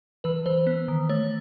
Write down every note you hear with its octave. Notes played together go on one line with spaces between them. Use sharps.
E3 B4
E3 C5
B3
D#3
A3 C#5